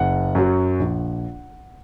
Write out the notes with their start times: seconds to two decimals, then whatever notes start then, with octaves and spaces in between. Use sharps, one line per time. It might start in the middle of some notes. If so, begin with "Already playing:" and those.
Already playing: F#1 F#5
0.35 F#2 F#3
0.80 A#1